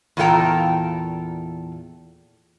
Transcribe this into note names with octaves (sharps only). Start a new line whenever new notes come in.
E2 A#2 F4 A4 G5 A#5